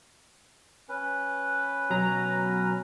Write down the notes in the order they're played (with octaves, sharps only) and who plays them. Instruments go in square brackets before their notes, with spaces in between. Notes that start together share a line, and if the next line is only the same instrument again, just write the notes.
[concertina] C#4 B4
[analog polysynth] B2 F#3 A#5